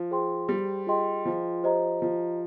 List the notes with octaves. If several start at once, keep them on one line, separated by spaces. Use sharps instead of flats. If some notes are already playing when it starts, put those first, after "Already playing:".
Already playing: F3
G#4 C5 G5 C6
G3
F4 G#4 D#5 G5 C6
F3
G4 C5 D#5 A#5
F3